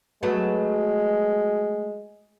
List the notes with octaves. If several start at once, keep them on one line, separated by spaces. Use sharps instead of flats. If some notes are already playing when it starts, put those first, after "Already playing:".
F#3 G#3 A3 B3